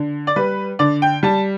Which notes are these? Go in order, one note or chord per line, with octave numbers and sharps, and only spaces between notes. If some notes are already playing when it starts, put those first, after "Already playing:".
Already playing: D3
D5
G3 B4
D3 D5
G5
G3 A5